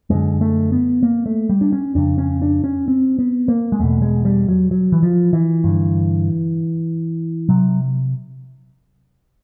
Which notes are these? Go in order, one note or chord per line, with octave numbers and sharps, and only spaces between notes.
F#2 D3 G#3
A3
B3
A#3
A3
G3
D4
C#4
F2 C#3 D4
C#4
D4
C#4
C4
B3
A#3
G#3
E2 B2 A3
G#3
G3
F#3
F#3
E3
F3
E3
G2 D3
C3 F#3